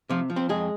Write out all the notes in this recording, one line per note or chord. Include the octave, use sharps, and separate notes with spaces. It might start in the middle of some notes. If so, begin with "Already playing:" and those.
C3 F3 F4
F3
C4 C5
F2 G#3 G#4